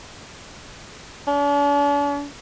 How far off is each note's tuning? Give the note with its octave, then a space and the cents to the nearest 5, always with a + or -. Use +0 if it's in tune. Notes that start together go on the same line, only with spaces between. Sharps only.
D4 -45